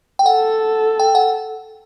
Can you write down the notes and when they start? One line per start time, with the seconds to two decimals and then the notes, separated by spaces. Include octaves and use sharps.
0.19 G5
0.26 A4 F#5
1.00 G5
1.15 F#5